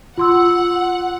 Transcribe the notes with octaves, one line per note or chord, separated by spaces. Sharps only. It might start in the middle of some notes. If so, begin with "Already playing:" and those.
F4 F#5 C6 E6